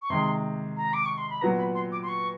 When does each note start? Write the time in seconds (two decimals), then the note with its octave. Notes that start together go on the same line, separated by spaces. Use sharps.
0.02 C#6
0.10 C3 D#3 G#3 C6
0.77 A#5
0.93 D6
1.06 C#6
1.18 C6
1.30 B5
1.41 A#2 F#3 B3 A#5
1.58 B5
1.75 C6
1.92 D6
2.03 C6
2.08 C#6